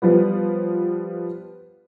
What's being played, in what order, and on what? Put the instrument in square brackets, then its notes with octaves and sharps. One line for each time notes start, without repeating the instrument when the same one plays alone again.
[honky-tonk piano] F3 G3 B3